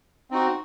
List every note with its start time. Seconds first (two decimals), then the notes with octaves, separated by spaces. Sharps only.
0.31 C4 D#4 F#4